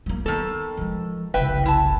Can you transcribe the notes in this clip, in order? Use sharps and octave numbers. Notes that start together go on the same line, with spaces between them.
F#3 A#3
D#3 B3 A4
F3 G#3
F#1 C2 B4 E5 G5
E4 A5